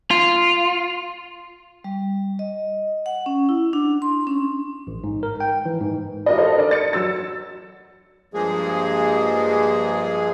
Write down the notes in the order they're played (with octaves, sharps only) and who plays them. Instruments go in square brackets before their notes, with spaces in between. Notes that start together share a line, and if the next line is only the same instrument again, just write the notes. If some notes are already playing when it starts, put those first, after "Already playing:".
[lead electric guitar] F4
[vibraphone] G3
D#5
F#5
C#4
E4
D4
C6
C#4
[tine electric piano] A1
G#2
A#4
G5
E3
G#2
[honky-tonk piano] E4 F#4 G4 A#4 D5 D#5
A4 B4 C5 D#5 F5
D4 A#4 D5 D#5
A6 C#7
F#3 E6 A6
[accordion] G2 F3 G#3 A#3 G#4